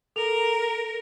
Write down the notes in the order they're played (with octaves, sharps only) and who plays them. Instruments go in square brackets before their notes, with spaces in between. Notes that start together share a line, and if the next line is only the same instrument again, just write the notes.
[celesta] A4 F7 [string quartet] A#4